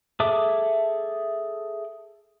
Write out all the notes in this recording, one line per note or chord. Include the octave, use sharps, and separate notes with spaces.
G#4 A4 E5 D6